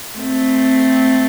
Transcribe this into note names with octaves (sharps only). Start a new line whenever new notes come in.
A3 C4